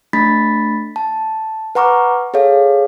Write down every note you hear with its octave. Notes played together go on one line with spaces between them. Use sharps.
A3 D4 B5 A6 B6
A5
B4 F#5 A#5 C#6 D6 F6
G#4 A4 C#5 F5